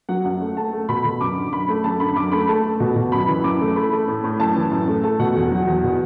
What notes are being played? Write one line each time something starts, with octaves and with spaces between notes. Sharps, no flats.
F#3 F#5
F#2 F#5
A3
A3 A5
A3
B2 B5
B2
F#2 D6
D3
F#2 B5
A3
F#2 A5
D3 B5
F#2 D6
A3 B5
A3 A5
A3
B2
B2
F#2 B5
E3
F#2 D6
A3
A3 B5
A3
A2
A2
F#2 A5
E3
F#2
A3
A3 A5
B2 F#5
E2
F#3
E2
B2